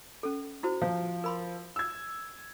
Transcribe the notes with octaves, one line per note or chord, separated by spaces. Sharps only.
C#4 A4
E4 F#4 C5
F3 F5
A#4 B5 C6
E6 G#6